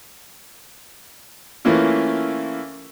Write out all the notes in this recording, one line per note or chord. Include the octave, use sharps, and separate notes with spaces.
E3 A3 A#3 C#4 E4 F4